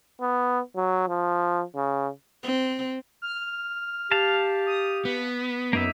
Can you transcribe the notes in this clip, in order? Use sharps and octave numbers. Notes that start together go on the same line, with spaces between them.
B3
F#3
F3
C#3
C4
F6
G4 F5 A5
D#6
B3 B6
F#2 A#3 D#4 E5